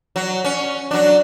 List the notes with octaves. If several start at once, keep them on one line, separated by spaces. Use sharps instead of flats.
F#3
C#4
F#3 D4